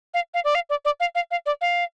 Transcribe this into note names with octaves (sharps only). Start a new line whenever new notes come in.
F5
F5
D5
F5
D5
D5
F5
F5
F5
D5
F5